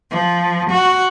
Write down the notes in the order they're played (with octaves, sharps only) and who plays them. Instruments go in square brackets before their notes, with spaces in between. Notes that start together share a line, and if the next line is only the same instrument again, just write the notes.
[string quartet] F3
F#4